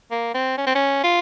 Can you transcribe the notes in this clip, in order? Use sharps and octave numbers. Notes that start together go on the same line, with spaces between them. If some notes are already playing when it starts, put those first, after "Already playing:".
A#3
C4
C#4
C4
C#4
F4